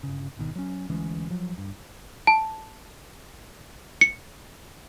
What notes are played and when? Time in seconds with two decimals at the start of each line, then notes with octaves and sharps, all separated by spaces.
0.03 G1 C#3
0.37 G#1 B2 D#3
0.56 F#3 C#4
0.90 D2 E3 G#3 C#4
1.30 F3 F#3
1.58 G2
2.27 A5
4.01 C#7